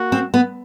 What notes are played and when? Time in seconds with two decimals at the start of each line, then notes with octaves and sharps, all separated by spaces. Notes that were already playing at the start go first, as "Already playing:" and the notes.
Already playing: A#3 F#4
0.12 C4
0.34 B3